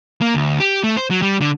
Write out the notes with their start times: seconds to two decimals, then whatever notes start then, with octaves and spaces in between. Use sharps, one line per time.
0.21 A#3
0.35 D2
0.60 G4
0.84 A3
0.97 C5
1.11 F#3
1.22 G3
1.41 D3